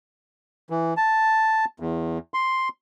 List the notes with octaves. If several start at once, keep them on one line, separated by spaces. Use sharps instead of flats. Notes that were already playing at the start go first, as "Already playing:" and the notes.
E3
A5
E2
C6